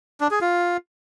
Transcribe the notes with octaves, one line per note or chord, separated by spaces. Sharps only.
D4
G#4
F4